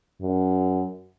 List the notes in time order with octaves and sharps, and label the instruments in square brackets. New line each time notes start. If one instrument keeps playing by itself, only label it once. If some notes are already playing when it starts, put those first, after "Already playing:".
[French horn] F#2